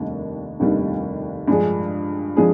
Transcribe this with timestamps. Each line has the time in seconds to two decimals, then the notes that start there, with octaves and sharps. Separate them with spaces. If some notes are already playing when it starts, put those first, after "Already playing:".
Already playing: F1 D#2 D#3 G3 D4
0.60 F1 D#2 D#3 G3 D4
1.48 G2 F3 G#3 D4 G#4
2.37 F3 G#3 D4 G#4